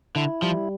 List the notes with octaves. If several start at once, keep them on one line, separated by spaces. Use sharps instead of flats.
D3 E4
F3 G3